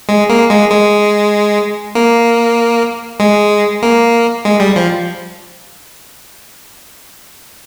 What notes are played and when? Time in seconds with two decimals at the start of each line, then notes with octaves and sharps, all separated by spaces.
0.09 G#3
0.30 A#3
0.50 G#3
0.71 G#3
1.95 A#3
3.20 G#3
3.82 A#3
4.45 G#3
4.60 G3
4.76 F3